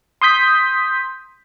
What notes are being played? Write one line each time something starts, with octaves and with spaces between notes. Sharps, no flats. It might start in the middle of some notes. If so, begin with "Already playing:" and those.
C6 D#6 G6 B6